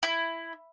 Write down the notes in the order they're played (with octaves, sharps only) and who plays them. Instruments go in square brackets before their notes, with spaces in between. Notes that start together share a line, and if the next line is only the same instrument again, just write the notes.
[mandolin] E4